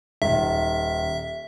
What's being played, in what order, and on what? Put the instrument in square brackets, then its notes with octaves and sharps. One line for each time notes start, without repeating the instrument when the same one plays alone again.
[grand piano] D#1 [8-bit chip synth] E5